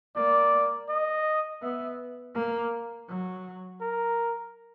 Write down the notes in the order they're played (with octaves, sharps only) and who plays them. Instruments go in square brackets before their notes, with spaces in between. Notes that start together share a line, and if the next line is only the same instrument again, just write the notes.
[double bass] A#3 [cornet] D5
[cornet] D#5
[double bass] B3 [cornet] E5
[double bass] A#3
F#3
[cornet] A#4